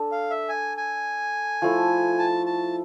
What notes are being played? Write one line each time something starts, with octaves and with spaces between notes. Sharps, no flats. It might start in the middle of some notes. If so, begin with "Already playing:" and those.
Already playing: D4 A4
F5
E5
G#5
G#5
F3 A3 E4
A5
A5